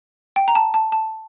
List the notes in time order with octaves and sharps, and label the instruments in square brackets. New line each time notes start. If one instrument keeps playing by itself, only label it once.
[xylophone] G5
A#5
A5
A5
A5